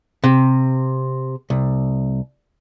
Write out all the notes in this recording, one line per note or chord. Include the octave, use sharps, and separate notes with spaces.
C3
C2